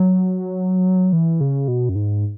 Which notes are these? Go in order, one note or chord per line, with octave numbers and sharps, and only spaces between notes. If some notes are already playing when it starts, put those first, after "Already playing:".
Already playing: F#3
E3
C#3
B2
F#2
G#2